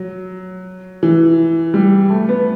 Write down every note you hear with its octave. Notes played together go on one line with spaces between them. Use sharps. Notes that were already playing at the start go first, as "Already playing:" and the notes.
Already playing: F#3
E3
G3
A3
B3